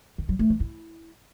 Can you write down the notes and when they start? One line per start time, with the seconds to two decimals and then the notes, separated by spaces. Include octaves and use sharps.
0.18 D#3
0.29 F#3
0.39 A3
0.50 E3
0.60 E4